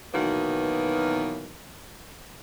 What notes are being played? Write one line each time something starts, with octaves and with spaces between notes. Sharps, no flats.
B2 D#3 E3 F#3 A#3 B3